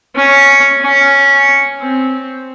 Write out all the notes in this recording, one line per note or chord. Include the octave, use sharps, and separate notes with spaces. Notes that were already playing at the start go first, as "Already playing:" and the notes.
C#4
C#4
C4